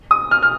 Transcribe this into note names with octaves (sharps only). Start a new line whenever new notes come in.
D#6
F6
F6